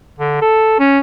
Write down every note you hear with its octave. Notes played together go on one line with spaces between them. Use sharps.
D3
A4
C#4